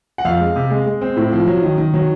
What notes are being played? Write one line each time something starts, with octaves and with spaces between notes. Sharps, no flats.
F#5
F2 F5
G#3
C3
G#3
G#3
C4
A2
F3
F#3
D#3
D#3
F#3